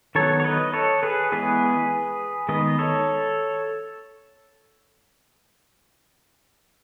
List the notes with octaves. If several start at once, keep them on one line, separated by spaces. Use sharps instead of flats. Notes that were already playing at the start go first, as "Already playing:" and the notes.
D#3 F#3 B3 A4 C#5
C#5
B4 D#5
A4 C#5
G#4 B4
E3 G#3 B3 G#4 B4
D#3 G#3 B3 B4 D#5
A4 C#5